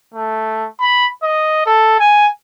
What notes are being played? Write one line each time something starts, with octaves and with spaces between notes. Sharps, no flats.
A3
B5
D#5
A4
G#5